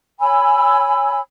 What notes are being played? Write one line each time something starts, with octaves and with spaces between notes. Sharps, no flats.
C#5 G#5 B5 E6